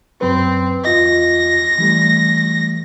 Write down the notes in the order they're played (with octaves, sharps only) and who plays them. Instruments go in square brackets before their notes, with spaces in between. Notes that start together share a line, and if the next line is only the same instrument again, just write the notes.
[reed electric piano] F#2 F#3 B4 [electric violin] C4
[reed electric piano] E2 F4 D#5 [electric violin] A#6
[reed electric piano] E3 G3 A3